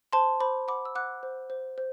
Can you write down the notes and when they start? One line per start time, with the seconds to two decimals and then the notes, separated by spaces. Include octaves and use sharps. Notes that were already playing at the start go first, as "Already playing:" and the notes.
0.13 C5 A5 C6
0.40 C5 B5 D6
0.68 F#5 B5 D6
0.85 E6
0.95 F#5 D6 F#6
1.23 C5
1.50 C5
1.78 C5